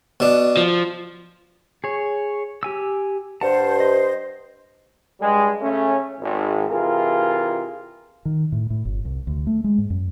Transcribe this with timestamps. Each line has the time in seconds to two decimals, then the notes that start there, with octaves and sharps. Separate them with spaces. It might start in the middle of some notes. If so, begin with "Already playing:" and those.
0.20 B2 D4
0.57 F3
1.84 G#4 C#5
2.63 G4 G#5 E6
3.41 G2 C5 F#5 A5
3.80 D#5
5.20 G2 G3 G#3
5.61 C#3 A3 C#4
6.20 G#1
6.68 C3 E3 F4 G#4 A#4
8.25 D#3
8.52 A2
8.70 A2
8.85 G1
9.05 C2
9.27 D2
9.47 A3
9.64 G#3
9.78 G#2
9.90 F#2